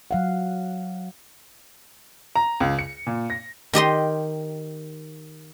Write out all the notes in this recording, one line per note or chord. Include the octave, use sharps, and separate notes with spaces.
F#3 F5 F#5
A#5
C#2
C#7
A#2
A#6
D#3 G4 D#5 C6